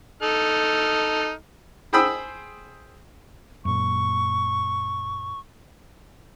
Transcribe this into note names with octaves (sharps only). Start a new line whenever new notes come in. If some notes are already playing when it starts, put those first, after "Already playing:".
D#4 A4 F6
G#4 C5 G5 B5 D#6 E6
F#2 A#2 C#6